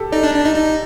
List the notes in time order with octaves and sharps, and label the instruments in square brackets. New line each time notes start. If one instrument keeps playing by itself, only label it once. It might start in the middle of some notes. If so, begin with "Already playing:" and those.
Already playing: [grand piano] G4 A4
[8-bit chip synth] D#4 [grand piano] D5
[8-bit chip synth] D4
D4
D#4
D#4